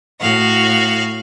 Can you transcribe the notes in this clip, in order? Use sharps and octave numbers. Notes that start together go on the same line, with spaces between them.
A2 F#4 F5